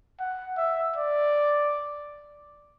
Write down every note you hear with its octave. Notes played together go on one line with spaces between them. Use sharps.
F#5
E5
D5